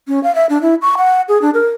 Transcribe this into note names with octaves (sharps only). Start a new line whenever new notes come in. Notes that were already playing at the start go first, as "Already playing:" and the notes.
C#4
F5
E5
D4
E4
C#6
F#5
G#4
D4
A#4